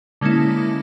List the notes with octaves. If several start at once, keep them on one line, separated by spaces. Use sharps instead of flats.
D3 G#3 A#3 C#4 E4